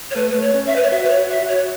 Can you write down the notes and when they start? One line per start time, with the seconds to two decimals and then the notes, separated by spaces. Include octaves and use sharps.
0.11 C#5
0.15 A3 B4
0.31 A3 B4
0.40 C#5
0.54 C#4
0.66 E5
0.76 B4
0.83 C#5
0.91 F#4 E5
1.04 B4
1.10 C#5
1.17 F#4
1.29 E5
1.42 F#4
1.48 C#5